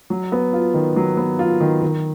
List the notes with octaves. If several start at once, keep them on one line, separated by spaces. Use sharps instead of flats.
F#3
B3
F4
D#3
F#3
B3
F4
D#3
D#3